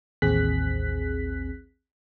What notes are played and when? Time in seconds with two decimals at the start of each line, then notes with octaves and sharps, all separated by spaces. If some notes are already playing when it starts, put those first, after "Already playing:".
0.22 A1 D#2 C4 G#4 F#6 B6